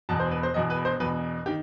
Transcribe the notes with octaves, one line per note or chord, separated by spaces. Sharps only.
E1 E2 B2 A5
C5
B4
C5
E1 E2 B2 D#5
B4
C5
E1 E2 B2 B4
D#3 G4